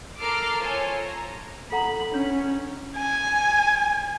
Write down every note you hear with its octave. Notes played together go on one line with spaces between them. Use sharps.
A4 A#4 D6 F6 C7
F4 A4 C5 C#5 G#5
A#5
A4 F#5 A#5 B5
C#4 D4 G6
G#5